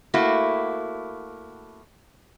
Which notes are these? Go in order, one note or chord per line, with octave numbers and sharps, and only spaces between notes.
A3 A#3 E4 F#4